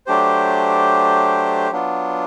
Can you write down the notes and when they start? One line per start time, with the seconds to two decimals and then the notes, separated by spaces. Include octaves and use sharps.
0.06 F#3 A3 D4 G4 C5
1.71 F#3 B3 D4 F4